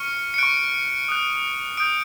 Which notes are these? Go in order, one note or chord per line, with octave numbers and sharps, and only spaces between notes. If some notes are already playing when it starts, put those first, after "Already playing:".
Already playing: C#6 F6 C#7
C#7
C#6 F#6 D7
D#6 F#6
D#6 G6 D7